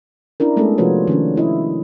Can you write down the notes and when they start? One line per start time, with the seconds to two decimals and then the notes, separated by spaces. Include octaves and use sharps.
0.40 C#4 D4 E4 A#4
0.57 G#3 A3 B3 C#4 G#4 A4
0.78 C3 F3 F4 F#4 B4 C#5
1.08 D#3 C#4 D4
1.36 D4 E4 D#5